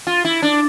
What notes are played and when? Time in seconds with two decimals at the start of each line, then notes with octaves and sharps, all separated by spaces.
0.07 F4
0.25 E4
0.42 D4